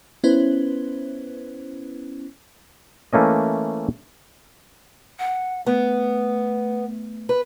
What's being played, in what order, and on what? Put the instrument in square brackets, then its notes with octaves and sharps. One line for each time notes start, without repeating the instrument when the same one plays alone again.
[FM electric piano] B3 C#4 E4 B4 C5
[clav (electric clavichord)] E3 A3 A#3 C#4 D#5
[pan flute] F#5
[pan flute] A3 [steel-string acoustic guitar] B3
[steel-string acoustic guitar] B4